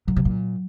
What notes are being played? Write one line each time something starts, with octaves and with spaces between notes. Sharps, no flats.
A#2 F#3
C3
A#2